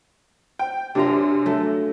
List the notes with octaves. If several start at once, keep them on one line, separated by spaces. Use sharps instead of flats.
G5
F#2 C3 D4 F4 A#4
F#3 A3